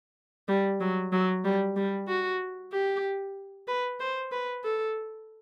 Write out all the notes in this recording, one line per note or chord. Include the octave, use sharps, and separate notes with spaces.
G3
F#3
F#3
G3
G3
F#4
G4
B4
C5
B4
A4